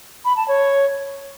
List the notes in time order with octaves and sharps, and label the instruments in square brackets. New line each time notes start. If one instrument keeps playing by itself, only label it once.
[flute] B5
A5
C#5